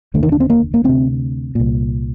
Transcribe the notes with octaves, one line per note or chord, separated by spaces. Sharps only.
F1 D#2 D3 A3
D#3
D4
C4
A#3
A#3
D2 C3 C4
C2 A#2